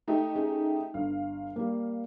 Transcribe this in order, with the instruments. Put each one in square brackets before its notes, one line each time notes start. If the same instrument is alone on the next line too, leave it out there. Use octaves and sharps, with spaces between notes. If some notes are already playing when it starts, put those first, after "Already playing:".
[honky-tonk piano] A3 D#4 G4
[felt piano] C#4 G#4
[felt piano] G1 [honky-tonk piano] F5
[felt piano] G3 A#3